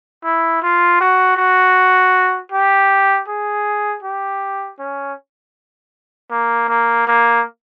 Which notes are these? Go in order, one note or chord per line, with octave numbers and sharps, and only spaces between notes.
E4
F4
F#4
F#4
G4
G#4
G4
C#4
A#3
A#3
A#3